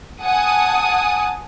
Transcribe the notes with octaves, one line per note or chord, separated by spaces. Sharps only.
F#5 G#5 A5 D#6